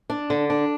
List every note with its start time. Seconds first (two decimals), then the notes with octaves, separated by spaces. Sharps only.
0.10 D4
0.30 D3
0.50 D4